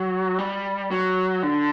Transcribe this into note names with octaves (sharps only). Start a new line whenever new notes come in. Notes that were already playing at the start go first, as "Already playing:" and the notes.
Already playing: F#3
G3
F#3
D3